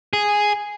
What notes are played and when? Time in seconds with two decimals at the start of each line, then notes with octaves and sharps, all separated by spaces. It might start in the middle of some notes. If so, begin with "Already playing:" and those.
0.13 G#4